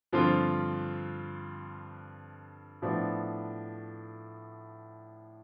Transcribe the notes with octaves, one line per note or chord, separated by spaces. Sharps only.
G2 D3 F3 C4 F4
A2 F3 B3 D4